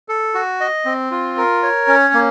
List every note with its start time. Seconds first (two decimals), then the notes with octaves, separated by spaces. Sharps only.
0.08 A4
0.35 F#4
0.60 D#5
0.85 C4
1.11 F4
1.37 A#4
1.63 C#5
1.88 C#4
2.14 A#3